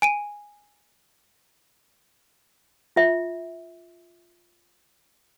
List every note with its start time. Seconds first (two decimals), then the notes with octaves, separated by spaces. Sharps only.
0.02 G#5 D7 D#7
2.96 F4 E5